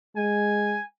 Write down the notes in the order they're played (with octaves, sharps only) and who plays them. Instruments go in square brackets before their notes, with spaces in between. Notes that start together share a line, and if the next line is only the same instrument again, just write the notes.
[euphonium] G#3 [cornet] G#5